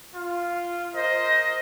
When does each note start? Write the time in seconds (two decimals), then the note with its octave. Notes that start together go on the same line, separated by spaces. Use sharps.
0.14 F4
0.93 A#4 C5 D#5